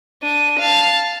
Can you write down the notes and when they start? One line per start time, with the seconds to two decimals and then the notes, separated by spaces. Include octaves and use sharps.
0.22 D4 D#7
0.59 F5 A5